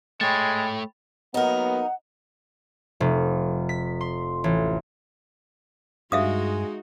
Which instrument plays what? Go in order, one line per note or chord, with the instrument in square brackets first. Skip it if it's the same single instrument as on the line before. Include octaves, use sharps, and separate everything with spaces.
[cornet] G#3 [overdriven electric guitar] A3 C#5 [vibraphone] G5 B5 [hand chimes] A6
[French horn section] F#3 A#3 B3 [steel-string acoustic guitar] D#4 A#4 [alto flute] F#5
[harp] F1
B6
C6
A1
[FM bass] G2 [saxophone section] G#3 [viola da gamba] D#4 F#4 [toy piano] E5 F5 D#6